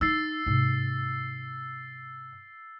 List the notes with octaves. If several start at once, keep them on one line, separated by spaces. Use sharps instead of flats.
D#4 E6 A6 C7
G#2 C3